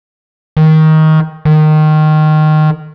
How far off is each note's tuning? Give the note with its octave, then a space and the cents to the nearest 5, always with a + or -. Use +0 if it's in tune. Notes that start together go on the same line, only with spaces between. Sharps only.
D#3 +15
D#3 -15